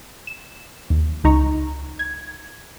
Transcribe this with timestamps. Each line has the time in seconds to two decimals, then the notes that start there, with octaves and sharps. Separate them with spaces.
0.27 E7
0.90 D#2
1.24 C#2 D#4 A#5 C#6
1.99 G#6